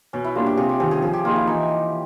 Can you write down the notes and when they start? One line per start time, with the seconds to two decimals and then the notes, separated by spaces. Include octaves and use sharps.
0.13 B2 C#4
0.24 E4
0.35 G3 A#3 D4 F4
0.46 G4
0.57 C3 G#4
0.69 G4
0.80 D#3 G3 C4 G#4
0.91 G#4
1.02 F3 G#4
1.13 G4
1.25 A#3 D#4 F4 G#4
1.36 E4
1.47 E3 D#4